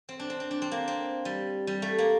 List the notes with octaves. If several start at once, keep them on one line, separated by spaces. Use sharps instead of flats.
C4
D4
C4
C4
D4
C4
A#3
C4
G3
G3
A3
A#3